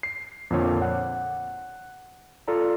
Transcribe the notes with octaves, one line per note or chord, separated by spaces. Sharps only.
C7
F2 A#2 D3 C#5
F#5
F4 A4 D5 A#5